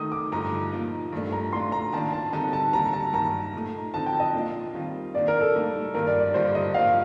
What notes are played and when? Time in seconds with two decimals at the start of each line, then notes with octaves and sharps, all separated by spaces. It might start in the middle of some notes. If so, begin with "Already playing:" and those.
Already playing: D#3 A3 D#4 D#6
0.12 D6
0.32 G2 D3 F3 A3 D#4 A#5
0.72 A#2 F3 A#3 D#4
1.13 G2 F3 A3 D4
1.32 A#5
1.53 A2 A3 D4 F4 C6
1.72 A#5
1.93 D#3 A#3 D4 F4 A5
2.13 A5
2.33 D3 G3 C4 D#4 A5
2.53 A5
2.73 D3 G3 A#3 A#5
2.93 A5
3.13 G2 D#3 A#3 A#5
3.54 A#2 A3 D#4
3.94 D3 F3 C4 D#4 A5
4.06 G5
4.20 D#5
4.34 A#2 F3 A#3 D4 F4
4.74 D#3 G3 C4 F4
5.14 D#3 A#3 D4 F4 D5
5.28 A#4
5.41 A4
5.54 A2 G3 A#3 D#4
5.94 G2 D#3 A#3 F4 A#4
6.07 D5
6.20 D5
6.34 G2 D3 G3 A#3 F4 C5
6.55 D#5
6.74 G2 F3 A#3 F5